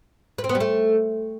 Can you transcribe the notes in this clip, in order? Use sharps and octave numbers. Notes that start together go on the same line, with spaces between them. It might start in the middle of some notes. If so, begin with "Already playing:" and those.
B4
C4
B3
G3
A3